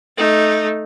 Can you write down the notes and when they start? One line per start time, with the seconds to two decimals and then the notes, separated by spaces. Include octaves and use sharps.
0.17 A3 D#4